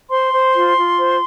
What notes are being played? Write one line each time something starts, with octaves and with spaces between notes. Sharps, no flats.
C5 C6
C5
F4
F4
C5